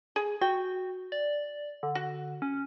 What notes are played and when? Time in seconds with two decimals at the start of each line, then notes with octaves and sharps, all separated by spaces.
0.16 G#4
0.41 F#4 G5
1.12 D5
1.83 D3
1.95 F#4
2.42 C#4